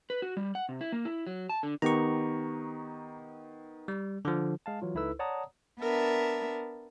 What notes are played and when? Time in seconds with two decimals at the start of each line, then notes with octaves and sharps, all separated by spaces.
0.10 B4
0.22 F#4
0.37 G3
0.55 F#5
0.69 C3
0.81 E4
0.92 A#3
1.05 E4
1.27 F#3
1.49 A5
1.63 D3
1.82 D#3 B3 G4 A#5 C#6
3.88 G3
4.25 D3 F3
4.66 G#3 F5 A5
4.82 E3 F#3 F4
4.94 C#2 D#4 E4 A4 B4 E6
5.19 C#5 D5 F#5 A5 A#5 D#6
5.81 B3 D4 A#4 E5 A5